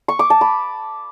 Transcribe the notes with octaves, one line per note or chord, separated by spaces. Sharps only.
C#6
D6
A5
B5